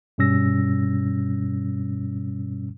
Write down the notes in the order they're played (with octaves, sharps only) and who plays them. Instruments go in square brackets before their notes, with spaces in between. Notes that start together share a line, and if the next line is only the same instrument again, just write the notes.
[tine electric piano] G2 B2 G3 C#4 E6 A#6